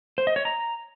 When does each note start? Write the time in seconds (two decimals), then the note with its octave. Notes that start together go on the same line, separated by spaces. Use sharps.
0.18 C5
0.27 D#5
0.36 C#5
0.45 A#5